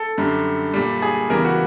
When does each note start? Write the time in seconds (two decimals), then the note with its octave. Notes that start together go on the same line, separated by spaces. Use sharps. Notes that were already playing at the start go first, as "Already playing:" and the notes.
Already playing: A4
0.18 F#2 D3 G3
0.74 A#2 G3
1.02 G#4
1.30 E2 C#3 E3 G3 A#4
1.45 F#4